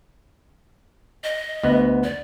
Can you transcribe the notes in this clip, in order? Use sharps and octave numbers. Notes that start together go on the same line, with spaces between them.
D#5
D2 B3
D5